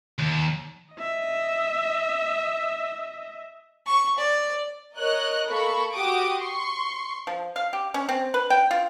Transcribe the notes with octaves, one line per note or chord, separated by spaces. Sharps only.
D#2
D#5 E5
C#6
D5
A#4 C#5 D#5 F#6
A#3 A4 B5 C#6
F#4 G4 D6 D#6 D7
C6 C#6
F3
F5
G4
C#4
C4
B4
G5
F4